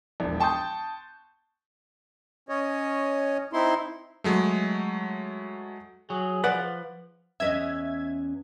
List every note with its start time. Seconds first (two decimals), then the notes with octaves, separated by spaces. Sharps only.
0.20 E1 A#1
0.40 G5 A5 C6 C#6 D#6 G6
2.49 C#4 C#5 D#5
3.53 C4 D#4 E4 C6
4.24 F#3 G#3 A3
6.10 F#3 G#4
6.44 F3 B4 D5 F#5
7.40 E2 C#4 D#5 E5 G#6